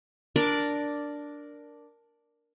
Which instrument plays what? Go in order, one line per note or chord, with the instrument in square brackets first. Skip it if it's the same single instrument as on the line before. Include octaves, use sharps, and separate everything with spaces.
[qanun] D4 A#4 D5